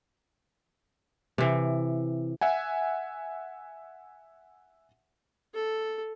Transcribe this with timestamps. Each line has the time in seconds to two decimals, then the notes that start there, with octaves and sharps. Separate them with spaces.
1.38 C3 E3
2.41 E5 F#5 G#5
5.55 A4